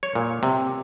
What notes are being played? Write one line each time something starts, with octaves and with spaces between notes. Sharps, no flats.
C#5
A#2
C3